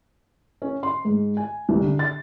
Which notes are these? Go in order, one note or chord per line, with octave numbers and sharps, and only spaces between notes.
C#4
C6
G#2
G#5
C2
D3
A6